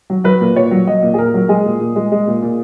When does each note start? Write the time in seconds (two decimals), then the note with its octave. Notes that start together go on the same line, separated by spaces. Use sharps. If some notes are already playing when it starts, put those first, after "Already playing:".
0.10 F#3
0.24 F#3 B4
0.41 A#2
0.56 A#2 C#5
0.71 F#3
0.87 F#3 D#5
1.03 A#2
1.14 G#4
1.18 A#2 A#4
1.34 F#3
1.49 G#3 G#4
1.65 A#2
1.80 A#2
1.96 G#3
2.12 G#3
2.27 A#2
2.42 A#2